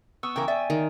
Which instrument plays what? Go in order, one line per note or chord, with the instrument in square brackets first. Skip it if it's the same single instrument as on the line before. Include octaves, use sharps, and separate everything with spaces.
[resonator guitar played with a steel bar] B3 [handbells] C#6 D#6 E6
[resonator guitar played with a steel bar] C#3 E3 A#4 [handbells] G5
[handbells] D5 G#5 [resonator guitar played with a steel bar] E5
[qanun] D#3